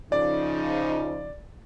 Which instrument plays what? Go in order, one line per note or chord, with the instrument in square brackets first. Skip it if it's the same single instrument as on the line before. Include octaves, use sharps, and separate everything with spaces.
[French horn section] C#3 F3 D#4 [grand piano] D5